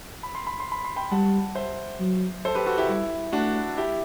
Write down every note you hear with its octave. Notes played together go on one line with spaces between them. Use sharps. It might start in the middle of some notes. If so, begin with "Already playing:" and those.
B5
C6
B5
C6
B5
C6
G5 B5
G3 F#5 A5
C5 E5
F#3
A4 C5
G4 B4
F#4 A4
E4 G4
G3 E4
A3 D4 F#4
E4 G4